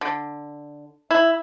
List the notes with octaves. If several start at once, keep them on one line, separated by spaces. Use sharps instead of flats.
D3
E4